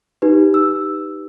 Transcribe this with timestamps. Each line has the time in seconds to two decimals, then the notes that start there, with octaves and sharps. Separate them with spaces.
0.22 D#4 G4 B4
0.54 E6